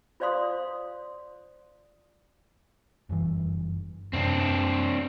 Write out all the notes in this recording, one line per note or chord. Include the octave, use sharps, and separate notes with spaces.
F4 C5 D5 F5 C6 D#6
F#1 G2 E3
F#2 C3 C4 D4